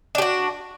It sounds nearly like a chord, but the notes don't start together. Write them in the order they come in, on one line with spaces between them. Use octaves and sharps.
D4 G4 F#4